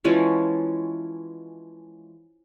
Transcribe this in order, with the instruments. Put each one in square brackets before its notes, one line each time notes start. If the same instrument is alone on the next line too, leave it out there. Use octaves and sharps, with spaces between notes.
[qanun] E3 F3 G#3 C#4